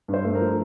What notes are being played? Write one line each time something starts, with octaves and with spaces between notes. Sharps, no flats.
G2
C5
A3
A#4
F3